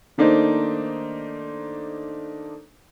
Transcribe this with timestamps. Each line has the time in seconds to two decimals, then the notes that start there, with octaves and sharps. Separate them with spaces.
0.18 D#3 A3 A#3 D4 D#4 C5